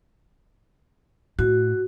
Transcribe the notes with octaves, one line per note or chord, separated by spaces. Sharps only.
A2 F#4